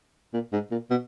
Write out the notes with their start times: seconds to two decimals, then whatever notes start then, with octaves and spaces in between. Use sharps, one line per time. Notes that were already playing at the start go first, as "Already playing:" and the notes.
0.33 A#2
0.53 G#2
0.71 A#2
0.90 B2